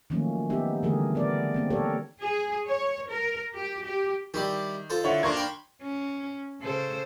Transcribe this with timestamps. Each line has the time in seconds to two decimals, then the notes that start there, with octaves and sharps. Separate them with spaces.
0.10 D#3 F3 F#3 A3 A#3 C#4
0.50 G#3 B3 D#4 G4 E5
0.83 D3 E3 G3 A3 G#4 A#4
1.15 B3 A#4 D5
1.54 A#3 C4
1.70 G4 A4 A#4 C#5 D5
2.20 G#4
2.67 C#5
3.10 A#4
3.56 G4
3.86 G4
4.34 D#3 G3 E4 G4
4.90 F4 A4 C5
5.04 D3 E4 C#5
5.23 A#3 D4 C6 C#6 G#6
5.37 G5 B5
5.82 C#4
6.60 C#3 A4 C5